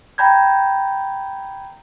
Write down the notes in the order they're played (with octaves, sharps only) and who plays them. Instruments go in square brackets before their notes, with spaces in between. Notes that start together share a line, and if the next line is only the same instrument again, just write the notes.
[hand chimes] G5 A#5 B5 G6 G#6